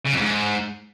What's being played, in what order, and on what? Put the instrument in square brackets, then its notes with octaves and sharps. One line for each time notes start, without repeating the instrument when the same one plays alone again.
[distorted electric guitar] C#3
F2
G#2